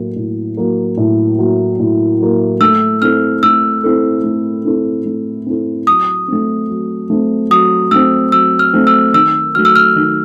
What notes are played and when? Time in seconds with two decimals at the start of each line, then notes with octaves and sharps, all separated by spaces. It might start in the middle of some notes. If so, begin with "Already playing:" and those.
Already playing: A2 F#3 A#3
0.16 A2
0.57 F#3 A#3
0.97 A2
1.39 F#3 A#3
1.80 A2
2.20 F#3 A#3
2.61 A3 E6
3.02 C4 E4 A4 F6
3.43 A3 E6
3.83 C4 E4 A4
4.24 A3
4.65 C4 E4 A4
5.06 A3
5.46 C4 E4 A4
5.87 F#3 D#6
6.28 A3 C4
6.70 F#3
7.10 A3 C4
7.50 F#3 D#6
7.91 A3 C4 E6
8.32 F#3 E6
8.59 F6
8.73 A3 C4
8.87 E6
9.14 D#3 E6
9.55 F#3 A3 F6
9.65 E6
9.76 F6
9.96 D#3